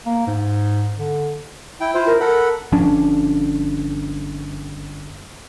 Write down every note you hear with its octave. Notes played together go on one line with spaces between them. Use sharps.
A#3
G#2
D3
E4 G5
E4 F4 C5
A#4
A4 A#4 F#5 B5
G1 F3 C#4 D4